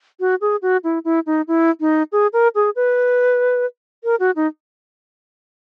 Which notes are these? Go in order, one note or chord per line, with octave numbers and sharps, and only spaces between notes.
F#4
G#4
F#4
E4
E4
D#4
E4
D#4
G#4
A#4
G#4
B4
A#4
F#4
D#4